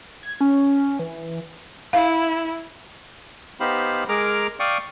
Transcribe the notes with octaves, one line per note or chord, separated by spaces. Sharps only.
G#6
C#4
E3
E4 F5
B3 D#4 G4 C5 F5 B5
G#3 G#4 A#4 A#5 D6 F6
D5 F5 G5 C#6 D#6